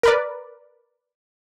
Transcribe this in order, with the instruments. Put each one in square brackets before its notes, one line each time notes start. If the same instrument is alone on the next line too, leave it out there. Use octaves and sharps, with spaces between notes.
[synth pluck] A#4 B4 D5